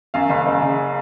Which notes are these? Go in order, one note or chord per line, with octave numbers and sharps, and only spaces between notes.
F#2 F5
F#1
F#1
C#3